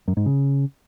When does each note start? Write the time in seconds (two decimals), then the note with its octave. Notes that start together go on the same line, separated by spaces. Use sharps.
0.08 F#2
0.17 G#2
0.26 C#3